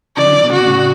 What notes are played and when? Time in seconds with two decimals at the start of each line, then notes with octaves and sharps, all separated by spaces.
0.17 C#3 E3 D5
0.26 D3 F#3
0.38 E3
0.43 B2 D3
0.52 C#3 F#4
0.60 B2
0.67 A2 C#3